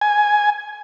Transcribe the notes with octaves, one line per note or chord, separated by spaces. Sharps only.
G#5